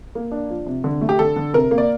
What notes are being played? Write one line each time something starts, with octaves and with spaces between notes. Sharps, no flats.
A#3
D4
F3
C3
D3
A3
G4
D3 A4
D3
C3 A#4
A#3
D5